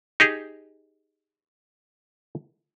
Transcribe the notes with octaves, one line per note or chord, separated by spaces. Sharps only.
D#4 G4 G#4